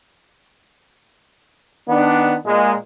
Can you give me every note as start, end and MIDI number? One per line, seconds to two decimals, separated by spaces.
1.88 2.35 51
1.88 2.35 59
1.88 2.35 62
2.45 2.73 46
2.45 2.73 56